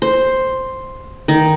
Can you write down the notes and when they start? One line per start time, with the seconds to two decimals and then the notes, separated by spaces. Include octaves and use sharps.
0.02 C5
1.28 D#3